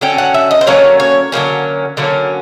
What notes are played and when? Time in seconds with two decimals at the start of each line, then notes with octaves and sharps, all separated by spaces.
0.01 D3 F#3 C#4 G5
0.18 F#5
0.34 E5
0.51 D#5
0.61 C5
0.67 D3 F#3 A#3 C#4 C#5
1.00 C#5
1.32 D3 F#3 A#3 C#4
1.97 D3 F#3 A#3 C#4